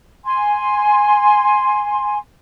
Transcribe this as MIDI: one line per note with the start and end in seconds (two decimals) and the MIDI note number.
0.24 2.17 80
0.24 2.17 84